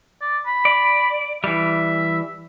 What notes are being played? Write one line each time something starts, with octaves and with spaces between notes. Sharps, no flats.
D5
B5
D5
E3 G3 E5